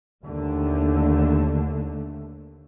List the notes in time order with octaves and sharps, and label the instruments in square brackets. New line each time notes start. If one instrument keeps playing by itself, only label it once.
[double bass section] D#2 D3 A3